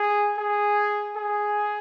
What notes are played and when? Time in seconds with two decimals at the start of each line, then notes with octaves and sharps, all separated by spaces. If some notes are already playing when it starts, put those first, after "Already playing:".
Already playing: G#4
0.38 G#4
1.16 G#4